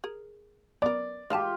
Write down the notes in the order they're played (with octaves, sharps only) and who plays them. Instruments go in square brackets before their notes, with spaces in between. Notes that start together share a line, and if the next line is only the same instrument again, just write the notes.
[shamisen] G#4 A#4
[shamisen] B3 A#4 [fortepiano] D5
[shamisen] G#3 F5 A5 [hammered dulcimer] F4 G4